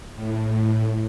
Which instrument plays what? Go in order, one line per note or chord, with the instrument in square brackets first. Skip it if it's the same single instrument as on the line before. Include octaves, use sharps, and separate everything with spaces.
[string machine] A2